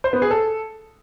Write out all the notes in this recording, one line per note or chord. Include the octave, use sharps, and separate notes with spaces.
C5
B3
G#4
A4